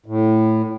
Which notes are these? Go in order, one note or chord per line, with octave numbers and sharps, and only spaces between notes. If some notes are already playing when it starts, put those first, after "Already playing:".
A2